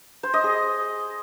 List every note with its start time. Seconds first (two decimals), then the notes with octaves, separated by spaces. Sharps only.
0.23 C5
0.34 D#5
0.44 G#4